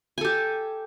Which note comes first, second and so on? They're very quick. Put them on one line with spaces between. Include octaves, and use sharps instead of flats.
G#5 A4 G4